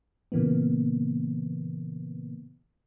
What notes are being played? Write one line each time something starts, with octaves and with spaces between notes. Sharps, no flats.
A#2 C#3 E3 A#3 B3